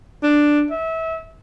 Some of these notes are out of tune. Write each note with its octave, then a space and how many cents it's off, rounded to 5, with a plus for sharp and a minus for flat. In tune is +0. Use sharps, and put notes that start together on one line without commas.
D4 +5
E5 -25